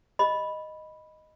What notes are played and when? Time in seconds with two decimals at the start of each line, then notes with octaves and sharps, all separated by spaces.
0.19 D#5 B5